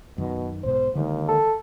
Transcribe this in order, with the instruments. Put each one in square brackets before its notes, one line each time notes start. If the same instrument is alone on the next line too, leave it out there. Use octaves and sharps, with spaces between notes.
[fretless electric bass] F#2 D#3 [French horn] B2
[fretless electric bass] B1 G#2 B2 [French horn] C5
[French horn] D#2 [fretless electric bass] D3 D#3 G#3
[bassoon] A4